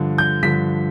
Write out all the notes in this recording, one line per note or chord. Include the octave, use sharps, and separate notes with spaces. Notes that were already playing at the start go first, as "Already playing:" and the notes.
Already playing: G2 D3 F3
G6
G2 D3 F3 B6